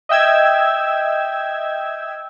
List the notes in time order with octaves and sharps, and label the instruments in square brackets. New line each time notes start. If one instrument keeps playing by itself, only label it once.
[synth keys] D#5 E5 G5 E6 G#6